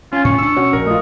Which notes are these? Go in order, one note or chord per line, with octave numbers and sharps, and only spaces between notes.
C#4 F4 G#5
A2 C#6
C#4 D4 E6
B2 C#4 F#4
A#1 A#4
A3 F4 D#5